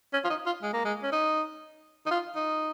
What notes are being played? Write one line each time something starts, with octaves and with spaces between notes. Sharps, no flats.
C#4
F4
D#4
F4
G#3
A#3
G#3
C#4
D#4
D#4
F4
D#4